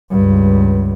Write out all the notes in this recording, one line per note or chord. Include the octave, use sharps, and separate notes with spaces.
C#2 G2